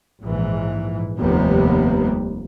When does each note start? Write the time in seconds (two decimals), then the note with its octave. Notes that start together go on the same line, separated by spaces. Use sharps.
0.22 A#1 G#2 E3
1.19 F1 D#2 C3 G3 A#3 B3